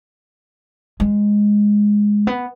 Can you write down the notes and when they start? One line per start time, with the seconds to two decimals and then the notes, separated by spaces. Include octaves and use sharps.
1.00 G#3
2.27 B3